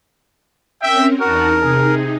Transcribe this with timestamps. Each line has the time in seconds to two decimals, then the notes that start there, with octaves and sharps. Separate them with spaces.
0.82 C4 C#4 A#4 E5 G5
1.20 E2 D#4 F#4 A#4 A5
1.62 C3 D#4 G#4